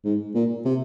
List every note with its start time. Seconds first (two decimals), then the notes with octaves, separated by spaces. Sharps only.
0.05 G#2
0.35 A#2
0.65 C3